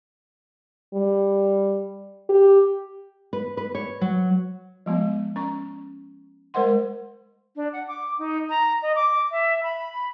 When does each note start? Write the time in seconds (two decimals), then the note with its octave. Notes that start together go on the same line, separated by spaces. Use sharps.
0.94 G3
2.29 G4
3.33 B4
3.57 B4
3.75 C#5
4.01 F#3
4.86 F3 G#3 B3
5.36 C#4 C#6
6.54 G#3 A#4 C5 D#5 F#5 C6
7.56 D4
7.73 F#5
7.88 D6
8.19 D#4
8.50 A#5
8.82 D#5
8.96 D6
9.31 E5
9.63 B5